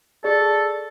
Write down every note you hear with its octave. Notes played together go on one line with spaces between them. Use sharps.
G#4 A4 D5